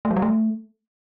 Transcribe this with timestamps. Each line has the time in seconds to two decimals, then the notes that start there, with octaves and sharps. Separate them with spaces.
0.05 A3
0.11 F#3
0.16 G3
0.22 A3